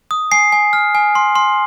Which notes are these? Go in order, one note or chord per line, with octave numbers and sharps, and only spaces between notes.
D#6
G#5 C7
G#5
F6
G#5
C6
C6